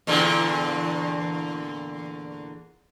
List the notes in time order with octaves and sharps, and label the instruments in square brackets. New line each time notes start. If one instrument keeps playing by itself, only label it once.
[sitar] E2 A#2 D3